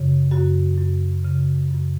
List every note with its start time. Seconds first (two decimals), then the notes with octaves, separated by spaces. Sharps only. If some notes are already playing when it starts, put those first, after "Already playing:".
Already playing: F#2 C#3
0.31 F#2 F#4
0.78 F#2
1.24 C#3
1.70 F#2